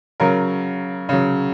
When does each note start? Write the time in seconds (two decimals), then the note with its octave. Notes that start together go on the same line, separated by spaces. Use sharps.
0.20 C#3 F#3 A#4
1.09 C#3 F#3